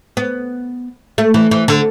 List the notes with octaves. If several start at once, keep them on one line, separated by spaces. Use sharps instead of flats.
B3
A3
E3
E3
D3